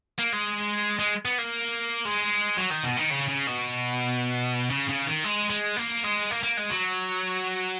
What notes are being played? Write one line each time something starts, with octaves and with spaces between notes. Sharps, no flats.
A#3
G#3
G#3
B3
A#3
G#3
F#3
D#3
B2
D#3
C#3
C#3
B2
C#3
C#3
D#3
G#3
G#3
A#3
G#3
A#3
A#3
G#3
F#3